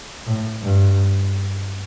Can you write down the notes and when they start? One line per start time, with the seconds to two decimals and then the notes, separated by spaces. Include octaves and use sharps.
0.27 A2
0.62 G2